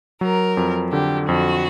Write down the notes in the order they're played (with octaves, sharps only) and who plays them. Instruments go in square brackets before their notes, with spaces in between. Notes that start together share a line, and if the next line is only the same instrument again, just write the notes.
[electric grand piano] F#3 [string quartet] A#4
[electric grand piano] F2
[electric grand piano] D3 [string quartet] G4
[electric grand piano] F2 [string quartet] F#4